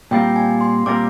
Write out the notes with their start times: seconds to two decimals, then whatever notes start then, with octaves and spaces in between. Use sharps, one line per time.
0.11 A#2 G3 C4 F4 A#4 G5
0.36 G#5
0.61 C6
0.86 A#2 G3 C4 F4 A#4 D6